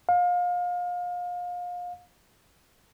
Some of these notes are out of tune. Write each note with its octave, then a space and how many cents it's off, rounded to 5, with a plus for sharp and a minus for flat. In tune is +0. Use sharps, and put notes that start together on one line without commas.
F5 +30